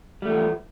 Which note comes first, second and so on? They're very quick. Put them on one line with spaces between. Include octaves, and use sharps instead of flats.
G3 A3 F3 E3